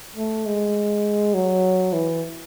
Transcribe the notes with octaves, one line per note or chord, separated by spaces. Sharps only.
A3
G#3
F#3
E3